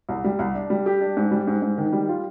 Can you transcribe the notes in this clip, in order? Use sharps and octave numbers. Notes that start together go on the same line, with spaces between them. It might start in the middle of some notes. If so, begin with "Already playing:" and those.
C2
G3
C2
D4
G3
G4
D4
G#2
G3
G#2
G#2
D#3
G3
F4